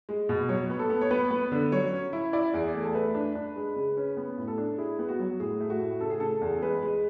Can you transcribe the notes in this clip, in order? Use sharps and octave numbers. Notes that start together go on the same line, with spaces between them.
G#3
B2
F#3 C#5
B3
A4
B3
C#5
B3 B4
B3
D3
F#3 C#5
C#4
E4
E4 D5
E2
A3
A4
A3 B4
D4
D4
G#3
C#3
C#4
B3
A2
A4
D4
E4 G#4
B3
F#4
F#3
A2 G#4
A3
F#4
A2
C#3 A4
G#4
C#3 A4
E2
G#3 B4
G#3